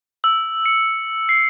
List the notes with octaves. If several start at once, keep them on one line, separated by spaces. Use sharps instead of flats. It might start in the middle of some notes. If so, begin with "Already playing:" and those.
E6
C#7
C7